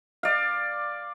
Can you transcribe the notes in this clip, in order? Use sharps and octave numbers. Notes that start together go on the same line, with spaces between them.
D5 F5